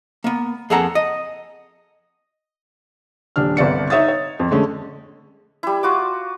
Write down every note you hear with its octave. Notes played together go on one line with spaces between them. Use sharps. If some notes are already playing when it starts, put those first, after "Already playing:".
A#3 B3
F2 A#3 G#4 A4 F#5 A#5
D#5
D#1 D4 F6
G1 C2 D5 C#7
D#4 C#5 E5 D#6 A6
C#5
F2
D3 G#3 A3 C#4
G3 E4
F4 F#4 D6